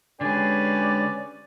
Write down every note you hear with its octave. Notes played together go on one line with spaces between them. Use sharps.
D3 G#3 C#4 G4 B4 D5 G#5